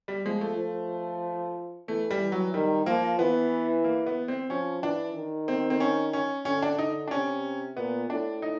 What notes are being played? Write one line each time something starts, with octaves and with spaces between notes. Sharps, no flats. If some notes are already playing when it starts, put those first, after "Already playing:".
G3
F3 G#3
A3
F3
E3 A3
G3
E3
F#3
D#3 G3
F3 A#3
E3 B3
A#3
B3
C4
F3 C#4
E3 D4
D#3
C4
C4
C#4
C#4
D3 C#4
D4
D3 D#4
D4
C3 C#4
A#2 B3
A2 D4
D#4